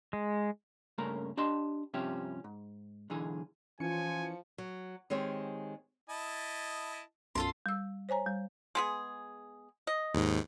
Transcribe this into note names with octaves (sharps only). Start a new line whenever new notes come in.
G#3
G2 C#3 A3 A#3 C#4 A#4
D4 G4 D#5 A5 C6
G2 C3 F3 C#4 G4 E5
G#2
B1 D3 E3 G#4
E3 F3 C#4 F4 G#5 C#7
F#3
D#3 G#3 C4 G4 C#5
E4 D#5 A5
B1 F#2 F4 A4 C6
G3 E6
C5 C#5 G#5 A#5
G3
G#3 B3 G#4
D#5
D#2 G#2